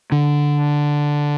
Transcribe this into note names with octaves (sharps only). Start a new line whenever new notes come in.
D3